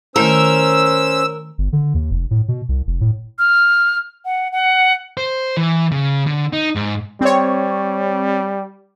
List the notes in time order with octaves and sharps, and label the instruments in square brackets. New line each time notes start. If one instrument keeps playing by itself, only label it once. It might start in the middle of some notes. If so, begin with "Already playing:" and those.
[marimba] D#3 A3 E4 [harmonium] C#4 C5 [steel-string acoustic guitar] A#4 [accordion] E6
[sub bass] G1
D3
D#2
F1
A2
B2
C2
F1
A2
[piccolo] F6
F#5
F#5
[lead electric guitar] C5
E3
C#3
D3
D#4
G#2
[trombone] G3 [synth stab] C4 C#5